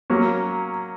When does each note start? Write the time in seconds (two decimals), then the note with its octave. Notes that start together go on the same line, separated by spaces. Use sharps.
0.10 F#3 A#3 C#4